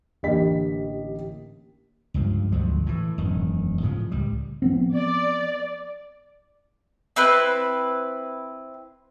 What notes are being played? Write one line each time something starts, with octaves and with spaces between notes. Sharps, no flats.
A1 D3 A#3 G4 D#5 B6
C#2 G2 F3
G#1 D2 F3 F#3
A2 E3
E1 F#2 D#3
A2 C#3 F3
C#2 G3
F3 B3 C4
D5
C4 E4 B4